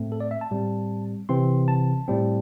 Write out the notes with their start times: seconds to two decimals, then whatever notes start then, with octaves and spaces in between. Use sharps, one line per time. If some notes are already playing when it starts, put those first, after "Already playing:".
Already playing: A2 A3 C4
0.12 A4
0.20 D5
0.31 E5
0.41 A5
0.51 A2 G3 C4
1.29 C3 E3 C4 C6
1.68 A5
2.08 A2 G3 C4